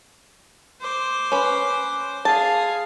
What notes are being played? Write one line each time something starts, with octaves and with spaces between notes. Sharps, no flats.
C5 D6
C#4 B4
G#4 F5 A5